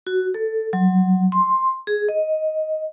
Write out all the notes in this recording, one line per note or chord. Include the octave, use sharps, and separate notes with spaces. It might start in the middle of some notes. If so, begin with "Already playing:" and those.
F#4
A4
F#3
C6
G#4
D#5